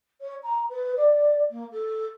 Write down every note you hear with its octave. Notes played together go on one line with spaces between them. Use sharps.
C#5
A#5
B4
D5
A#3
A4